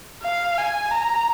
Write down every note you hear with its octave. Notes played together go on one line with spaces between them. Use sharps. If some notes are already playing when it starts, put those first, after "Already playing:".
F5
G#5
A#5